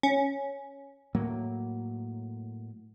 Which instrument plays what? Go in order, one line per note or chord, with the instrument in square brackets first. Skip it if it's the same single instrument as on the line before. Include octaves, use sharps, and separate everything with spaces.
[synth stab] C#4
[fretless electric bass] A2 F#3 A#3